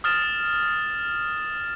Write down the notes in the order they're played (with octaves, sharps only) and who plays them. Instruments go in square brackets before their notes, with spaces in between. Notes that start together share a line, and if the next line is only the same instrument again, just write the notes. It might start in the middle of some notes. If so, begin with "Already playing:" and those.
[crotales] D#6 F6 A6 E7